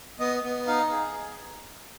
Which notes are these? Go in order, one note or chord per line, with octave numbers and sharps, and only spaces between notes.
B3 D#5
B3
D#4 F5
G#4